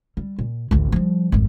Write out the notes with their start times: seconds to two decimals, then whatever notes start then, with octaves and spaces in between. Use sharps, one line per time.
0.17 G3
0.39 A#2
0.71 A1 D2
0.92 F3 G3
1.32 G#1 F2